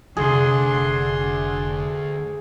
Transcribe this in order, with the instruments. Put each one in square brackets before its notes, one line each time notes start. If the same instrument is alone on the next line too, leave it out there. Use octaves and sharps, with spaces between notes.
[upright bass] F1 [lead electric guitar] D2 [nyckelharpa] D4 C6 [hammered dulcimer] G#4